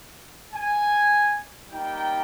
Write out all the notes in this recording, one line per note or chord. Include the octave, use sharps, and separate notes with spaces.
G#5
G3 A#3 D#4 G5